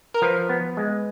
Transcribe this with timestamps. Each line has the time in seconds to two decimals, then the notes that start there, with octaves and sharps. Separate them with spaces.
0.14 A#4
0.22 F3 B4
0.49 B3
0.77 G#3